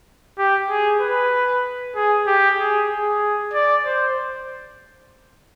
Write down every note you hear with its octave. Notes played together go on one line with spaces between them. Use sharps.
G4
G#4
B4
G#4
G4
G#4
G#4
D5
C5